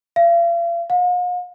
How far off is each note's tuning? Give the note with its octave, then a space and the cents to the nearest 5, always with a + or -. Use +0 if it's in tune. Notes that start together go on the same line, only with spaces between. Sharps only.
F5 -40
F5 +45